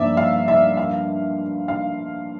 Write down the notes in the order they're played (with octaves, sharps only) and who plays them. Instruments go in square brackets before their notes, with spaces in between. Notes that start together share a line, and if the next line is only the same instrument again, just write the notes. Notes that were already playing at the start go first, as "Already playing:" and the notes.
Already playing: [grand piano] G2 F3 A#3 [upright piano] D5 E5
[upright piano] F5
E5
F5
F5